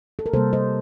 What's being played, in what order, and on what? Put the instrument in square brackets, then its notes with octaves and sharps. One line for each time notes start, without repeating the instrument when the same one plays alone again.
[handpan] A4
A#4
C3 G3 A#3 A4 C5
C5 D#5